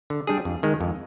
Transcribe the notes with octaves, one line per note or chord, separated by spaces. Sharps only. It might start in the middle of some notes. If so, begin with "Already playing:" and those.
D3
G3 D4 G#4
F2
D#3 G#3
F2